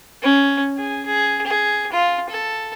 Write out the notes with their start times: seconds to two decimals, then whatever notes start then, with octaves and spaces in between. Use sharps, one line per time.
0.23 C#4
0.77 G#4
1.06 G#4
1.46 G#4
1.93 F4
2.30 A4